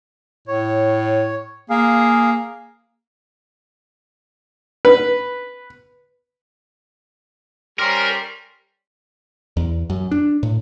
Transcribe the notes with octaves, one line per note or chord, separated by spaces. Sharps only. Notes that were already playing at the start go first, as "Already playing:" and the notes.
A2 C#5
A#3 G#4 F5
B4
G3 C#4 A#4 C5
E2
F#2
D4
A2